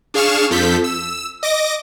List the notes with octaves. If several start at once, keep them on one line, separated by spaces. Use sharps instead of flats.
D4 G#4 F5 C#6 F6 E7
F2 F3 A4 G6 B6
E6
D#5 D6 A#6